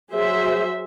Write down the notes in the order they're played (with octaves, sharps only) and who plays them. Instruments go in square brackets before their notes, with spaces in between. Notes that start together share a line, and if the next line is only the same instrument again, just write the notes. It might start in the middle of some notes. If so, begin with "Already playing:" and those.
[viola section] F#3 G#4 C5 E5